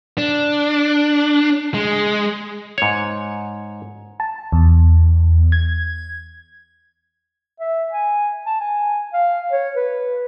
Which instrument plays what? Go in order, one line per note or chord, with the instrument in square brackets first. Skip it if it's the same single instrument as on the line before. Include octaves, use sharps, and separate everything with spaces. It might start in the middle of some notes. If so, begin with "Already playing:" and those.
[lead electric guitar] D4
G#3
[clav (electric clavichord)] G#2 C#5
[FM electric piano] A5
E2
G#6
[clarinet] E5
G#5
A5
G#5
F5
C#5
B4